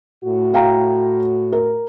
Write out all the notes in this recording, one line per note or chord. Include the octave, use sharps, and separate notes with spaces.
A2 F#4
F5 G5 A#5
A#4